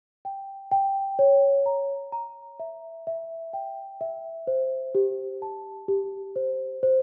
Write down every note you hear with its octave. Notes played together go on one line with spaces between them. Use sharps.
G5
G5
C#5
A#5
A#5
E5
E5
G5
E5
C5
G4
A5
G4
C5
C5